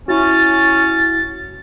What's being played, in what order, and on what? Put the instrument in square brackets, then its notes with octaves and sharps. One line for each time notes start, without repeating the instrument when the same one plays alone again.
[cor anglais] C#4 [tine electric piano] E4 F#4 [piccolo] A6